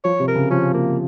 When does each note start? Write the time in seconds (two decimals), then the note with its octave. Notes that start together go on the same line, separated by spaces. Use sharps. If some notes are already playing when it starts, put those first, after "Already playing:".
0.04 F3 C#5
0.20 C3
0.28 A#4
0.35 C#3
0.51 F3 C#4
0.74 A#3